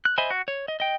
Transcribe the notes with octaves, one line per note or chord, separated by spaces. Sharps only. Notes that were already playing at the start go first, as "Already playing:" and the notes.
F#6
C5 D#5 E5 G#5 B5
F#4
C#5
D#5
D#5 G5